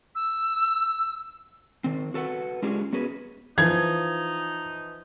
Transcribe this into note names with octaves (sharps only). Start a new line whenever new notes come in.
E6
D#3 C4
F#4 A4 B4 F#5
G#3 C#4 D4 F4 G4 G#4
B3 C#4 F#4 G#4 B4
E3 F3 D#4 G#6